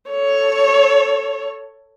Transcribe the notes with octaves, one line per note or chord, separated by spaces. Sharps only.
A4 C#5